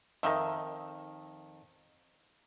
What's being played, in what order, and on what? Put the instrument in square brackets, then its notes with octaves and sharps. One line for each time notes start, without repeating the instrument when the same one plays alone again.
[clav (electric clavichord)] F2 D#3 [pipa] A#4 D#5 E5